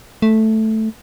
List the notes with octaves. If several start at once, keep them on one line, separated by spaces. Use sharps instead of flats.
A3